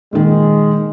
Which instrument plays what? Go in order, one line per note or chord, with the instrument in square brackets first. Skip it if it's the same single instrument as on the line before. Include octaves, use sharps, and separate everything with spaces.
[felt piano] A#2 D#3 [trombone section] G#3